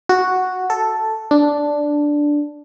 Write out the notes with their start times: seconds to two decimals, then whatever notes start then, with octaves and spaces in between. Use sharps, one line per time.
0.09 F#4
0.70 A4
1.31 D4